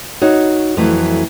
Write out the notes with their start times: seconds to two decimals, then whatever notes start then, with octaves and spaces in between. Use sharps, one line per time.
0.21 D#4 F#4 C#5
0.77 F2 E3 F#3 A3